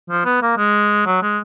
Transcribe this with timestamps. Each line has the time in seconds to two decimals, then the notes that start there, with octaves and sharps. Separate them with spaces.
0.10 F3
0.25 B3
0.42 A#3
0.57 G#3
1.06 F#3
1.22 G#3